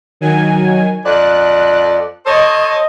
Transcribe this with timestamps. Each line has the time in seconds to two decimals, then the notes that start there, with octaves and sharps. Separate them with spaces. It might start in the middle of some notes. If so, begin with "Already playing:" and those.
0.21 D#3 F#3 G#5
1.05 F2 D5 F#6
2.26 A4 C5 C#5 D#5